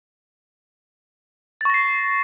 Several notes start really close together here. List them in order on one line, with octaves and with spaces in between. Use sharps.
A6 C#6 A#6 C7